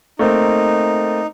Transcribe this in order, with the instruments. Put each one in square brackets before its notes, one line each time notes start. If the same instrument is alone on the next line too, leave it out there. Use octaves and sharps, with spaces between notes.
[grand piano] A3 A#3 C4 [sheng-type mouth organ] D#4